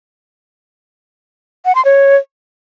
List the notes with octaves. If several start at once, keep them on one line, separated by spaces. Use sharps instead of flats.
F#5
C6
C#5